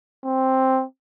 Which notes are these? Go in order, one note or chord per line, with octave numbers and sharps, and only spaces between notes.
C4